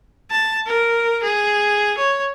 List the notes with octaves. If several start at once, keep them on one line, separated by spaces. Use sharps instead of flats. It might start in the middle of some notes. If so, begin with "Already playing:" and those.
A5
A#4
G#4
C#5